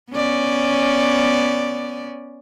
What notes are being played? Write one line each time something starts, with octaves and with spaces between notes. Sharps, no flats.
B3 C#4 D5